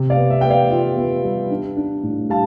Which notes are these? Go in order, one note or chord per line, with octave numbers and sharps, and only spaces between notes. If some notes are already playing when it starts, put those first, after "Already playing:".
Already playing: C3
D5 F5
B3
E5
B3 G5
D5 F5
F4
B3
G3
D4
D4
A2
G3 F5 A5